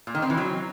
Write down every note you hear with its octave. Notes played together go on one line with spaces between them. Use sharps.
A#2
D#3
C4
E3
F#3